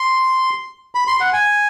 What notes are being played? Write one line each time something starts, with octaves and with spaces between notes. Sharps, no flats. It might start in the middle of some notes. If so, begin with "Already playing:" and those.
Already playing: C6
B5
C6
F#5
G#5